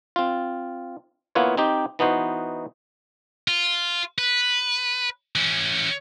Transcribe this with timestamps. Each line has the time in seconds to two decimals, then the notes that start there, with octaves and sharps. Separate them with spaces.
0.16 C4 F4
1.35 A#3 B3 E4 F4 B4 C#5
1.57 C4 D#4 G4
1.99 E3 B3 D#4 F#4 C5
3.48 F4
4.18 B4
5.36 E3 C#4